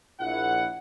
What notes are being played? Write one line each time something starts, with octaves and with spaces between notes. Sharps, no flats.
A#1 E4 F#5